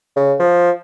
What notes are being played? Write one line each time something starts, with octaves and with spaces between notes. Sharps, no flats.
C#3
F3